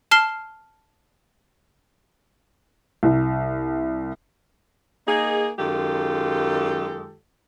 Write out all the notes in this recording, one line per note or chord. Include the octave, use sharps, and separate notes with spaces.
A5 F6 C7 G7
C2
A#3 D#4 G#4
F#2 D#3 G#3 F4 G4 A4